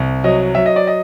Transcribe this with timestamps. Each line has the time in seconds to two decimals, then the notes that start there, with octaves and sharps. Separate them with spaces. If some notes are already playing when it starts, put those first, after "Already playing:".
Already playing: C2
0.24 F#3 D#5
0.55 F#3 E5
0.66 D#5
0.76 D5
0.87 D#5